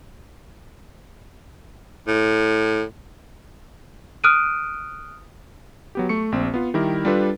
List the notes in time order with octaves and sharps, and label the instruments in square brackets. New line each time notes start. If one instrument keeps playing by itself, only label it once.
[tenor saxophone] A2
[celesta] D#6 F6 F#6 D7 D#7
[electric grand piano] F#3 B3 G4
A3 C#6 C#7
A#1 C4
B3 F4
D#3 G3 E4 G4 A#4
G3 D4 F4 A4 B4